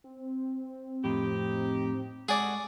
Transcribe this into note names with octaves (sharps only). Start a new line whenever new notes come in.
C4
F2 A2 D#4 G4
G#3 F#4 G#4 A4 D5 F#5